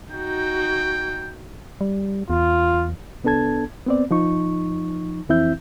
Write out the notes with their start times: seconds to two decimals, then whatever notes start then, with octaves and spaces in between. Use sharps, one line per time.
0.12 D#4 F#4 G5
1.81 G3
2.30 E2 F4
3.24 C2 B3 D4 A4 A5 G#6
3.86 B3 C4 D5
4.11 F3 D#4 C#6
5.29 F2 E3 C4 E4 E5 G6